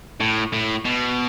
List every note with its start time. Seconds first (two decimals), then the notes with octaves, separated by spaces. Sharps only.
0.20 A2
0.53 A2
0.85 B2